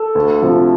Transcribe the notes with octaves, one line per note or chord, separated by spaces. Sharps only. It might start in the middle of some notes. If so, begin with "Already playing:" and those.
Already playing: A4
D2
C3 F3